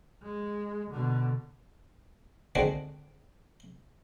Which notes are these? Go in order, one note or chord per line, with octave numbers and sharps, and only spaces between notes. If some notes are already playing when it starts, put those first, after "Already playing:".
G#3
B2 D3
D3 D#3 G#3 C4 D4 F#4